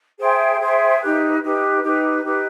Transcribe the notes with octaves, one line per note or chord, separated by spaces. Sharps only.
G#4 C5 E5 G5
G#4 C5 E5 G5
D#4 G4 B4
D#4 G4 B4
D#4 G4 B4
D#4 G4 B4